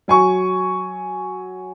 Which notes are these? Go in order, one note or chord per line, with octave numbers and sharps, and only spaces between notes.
F#3 G#5 C#6